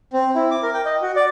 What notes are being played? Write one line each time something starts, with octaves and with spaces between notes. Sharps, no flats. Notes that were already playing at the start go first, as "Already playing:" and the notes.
C4
E4
D6
A#4
G5
D#5
F#4
D5